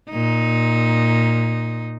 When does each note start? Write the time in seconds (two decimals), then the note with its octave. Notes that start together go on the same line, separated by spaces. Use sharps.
0.11 A#2 D#4